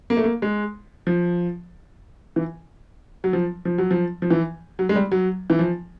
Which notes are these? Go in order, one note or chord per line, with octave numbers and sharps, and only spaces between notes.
A#3
A3
A#3
G#3
F3
E3
F#3
F3
F3
F#3
F3
F3
E3
F#3
G#3
G3
F#3
E3
F3